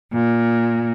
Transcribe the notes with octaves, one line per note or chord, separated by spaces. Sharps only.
A#2